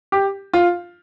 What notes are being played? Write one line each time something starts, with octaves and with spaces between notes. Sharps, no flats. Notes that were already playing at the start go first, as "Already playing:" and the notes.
G4
F4